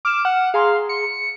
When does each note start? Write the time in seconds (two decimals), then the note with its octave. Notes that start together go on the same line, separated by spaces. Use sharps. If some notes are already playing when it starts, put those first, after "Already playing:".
0.05 D6 F6 E7
0.25 F#5
0.54 G#4 F5 A#5 C6
0.89 C#7